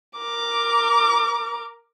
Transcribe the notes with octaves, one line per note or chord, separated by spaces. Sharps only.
A#4 D6